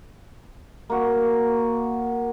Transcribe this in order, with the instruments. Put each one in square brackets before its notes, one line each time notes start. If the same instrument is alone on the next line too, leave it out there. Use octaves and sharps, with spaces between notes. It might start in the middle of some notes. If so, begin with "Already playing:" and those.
[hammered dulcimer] A#3 F#4